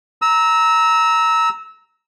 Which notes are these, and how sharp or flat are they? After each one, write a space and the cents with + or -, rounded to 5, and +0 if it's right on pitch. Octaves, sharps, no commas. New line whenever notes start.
A#5 +0 E6 -20